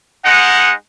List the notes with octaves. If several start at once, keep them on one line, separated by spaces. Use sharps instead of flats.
G#3 D#4 F#5